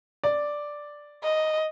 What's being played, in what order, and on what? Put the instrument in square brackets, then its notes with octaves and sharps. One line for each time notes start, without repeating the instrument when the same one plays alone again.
[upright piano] D5
[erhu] D#5